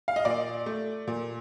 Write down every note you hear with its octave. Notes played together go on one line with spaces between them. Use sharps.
F5
D#5
A#2 D5
A3
A#2